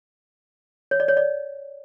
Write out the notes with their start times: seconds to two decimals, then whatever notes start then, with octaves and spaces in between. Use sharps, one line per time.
0.91 C#5
1.00 D5
1.08 C#5
1.17 D5